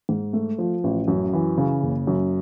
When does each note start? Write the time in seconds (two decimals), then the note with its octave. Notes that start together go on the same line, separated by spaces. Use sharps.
0.09 G#2
0.33 A3
0.58 F3
0.84 A1
1.08 F#2
1.33 E3
1.57 C#3
1.83 F#1
2.07 F#2